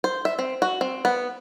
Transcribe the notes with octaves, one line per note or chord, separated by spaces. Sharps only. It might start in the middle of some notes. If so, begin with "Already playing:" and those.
C5
E5
C4
F#4
C4
B3